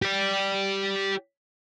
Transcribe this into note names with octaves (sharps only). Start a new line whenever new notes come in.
G4 D5